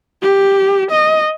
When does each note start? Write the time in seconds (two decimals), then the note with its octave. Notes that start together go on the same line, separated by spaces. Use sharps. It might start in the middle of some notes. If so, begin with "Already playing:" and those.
0.22 G4
0.92 D#5